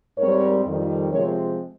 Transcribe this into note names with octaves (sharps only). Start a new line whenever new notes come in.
G#2 G3 C4 A#4 C#5
F2 D#3 G3
C3 F3 G#3 C4 A#4 C#5